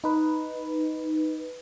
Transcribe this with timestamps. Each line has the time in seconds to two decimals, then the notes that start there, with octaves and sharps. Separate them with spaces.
0.04 D#4 B4